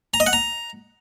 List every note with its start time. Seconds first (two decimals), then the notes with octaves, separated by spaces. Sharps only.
0.14 A#5
0.20 D#5
0.27 F#5
0.33 A#5